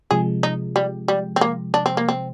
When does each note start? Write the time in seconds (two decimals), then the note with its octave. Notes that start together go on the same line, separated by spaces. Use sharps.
0.11 C3 F3 G#3 G#4
0.43 D#4
0.76 G3
1.08 G3
1.36 C4
1.41 A#3
1.74 D4
1.86 C4
1.97 A#3
2.09 C4